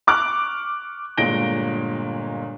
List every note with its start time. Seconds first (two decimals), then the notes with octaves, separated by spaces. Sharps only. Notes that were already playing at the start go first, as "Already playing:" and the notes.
0.07 C#6 D6 F6 F#6
1.17 G1 A#2 G#3 A#6 D7 G7